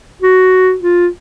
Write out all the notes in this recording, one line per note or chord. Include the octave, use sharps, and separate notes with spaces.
F#4
F4